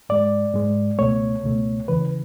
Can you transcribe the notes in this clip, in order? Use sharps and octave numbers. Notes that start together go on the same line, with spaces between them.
G#2 G#3 D5
G#2 G#3
C#2 B2 A3 C#5
C#2 B2 A3
E2 C#3 E3 B4